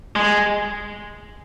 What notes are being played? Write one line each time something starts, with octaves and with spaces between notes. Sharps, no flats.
G#3